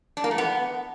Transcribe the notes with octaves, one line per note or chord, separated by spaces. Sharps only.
D4
A#3
A3
B3